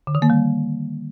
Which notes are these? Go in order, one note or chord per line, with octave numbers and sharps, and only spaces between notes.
D3
D#3
A#3
G3